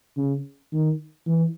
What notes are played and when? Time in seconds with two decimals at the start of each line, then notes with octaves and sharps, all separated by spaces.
0.17 C#3
0.72 D#3
1.27 E3